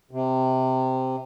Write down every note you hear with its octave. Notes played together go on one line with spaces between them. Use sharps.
C3